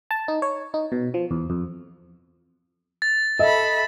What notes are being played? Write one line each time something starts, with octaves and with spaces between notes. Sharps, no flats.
A5
D#4
C#5
D#4
B2
F3
E2
F2
A6
A4 D#5 E5 B5